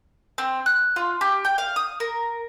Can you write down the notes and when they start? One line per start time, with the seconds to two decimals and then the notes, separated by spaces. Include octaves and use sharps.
0.38 C4
0.66 F#6
0.96 F4
1.21 G4
1.45 G5
1.58 F5
1.76 D#6
2.00 A#4